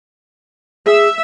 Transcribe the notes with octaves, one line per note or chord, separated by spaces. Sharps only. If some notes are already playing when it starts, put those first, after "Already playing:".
G#4 E5